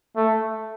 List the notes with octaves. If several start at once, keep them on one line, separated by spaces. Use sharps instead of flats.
A3